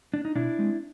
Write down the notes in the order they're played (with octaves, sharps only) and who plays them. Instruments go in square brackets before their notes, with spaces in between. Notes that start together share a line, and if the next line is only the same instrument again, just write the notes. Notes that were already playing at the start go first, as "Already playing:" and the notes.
[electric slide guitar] D4
D#4
B2 D4 E4
G#3 C4